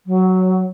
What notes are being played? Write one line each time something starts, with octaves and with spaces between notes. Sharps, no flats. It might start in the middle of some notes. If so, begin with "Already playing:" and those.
F#3